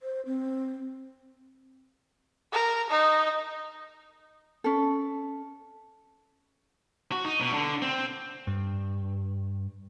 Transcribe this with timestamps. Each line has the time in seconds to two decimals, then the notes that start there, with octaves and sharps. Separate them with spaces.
0.01 C5
0.26 C4
2.53 A#4
2.90 D#4
4.64 C#4 A4
7.12 F#4
7.25 D#4
7.41 B2
7.53 D3
7.82 C4
8.47 G2